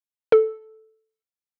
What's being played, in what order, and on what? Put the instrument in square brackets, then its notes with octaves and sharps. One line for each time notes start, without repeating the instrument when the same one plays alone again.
[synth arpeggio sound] A4